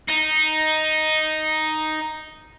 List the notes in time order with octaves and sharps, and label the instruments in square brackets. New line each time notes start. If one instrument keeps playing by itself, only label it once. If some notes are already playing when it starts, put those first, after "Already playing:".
[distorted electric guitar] D#4